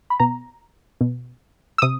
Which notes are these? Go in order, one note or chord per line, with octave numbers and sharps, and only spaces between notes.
B5
B2 A#5
B2
E6
C3 D#6